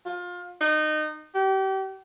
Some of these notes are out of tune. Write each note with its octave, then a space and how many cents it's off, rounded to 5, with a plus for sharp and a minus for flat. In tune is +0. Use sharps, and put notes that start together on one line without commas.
F4 +25
D#4 -25
G4 -35